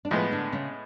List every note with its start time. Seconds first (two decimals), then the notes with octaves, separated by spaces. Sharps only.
0.05 D4
0.11 A2 F3 G#3 B3 F4
0.31 D3 D4
0.53 C#3 C#4